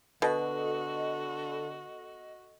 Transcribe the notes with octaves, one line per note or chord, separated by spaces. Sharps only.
B2 D3 F#4 A4 D#5